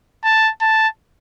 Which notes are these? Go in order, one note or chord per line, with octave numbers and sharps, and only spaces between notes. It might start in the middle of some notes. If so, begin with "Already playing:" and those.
A5
A5